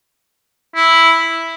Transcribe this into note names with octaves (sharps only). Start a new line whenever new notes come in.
E4